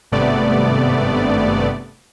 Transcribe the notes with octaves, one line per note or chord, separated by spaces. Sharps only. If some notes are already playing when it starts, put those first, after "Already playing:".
G#1 G2 C3 A3 B3 D5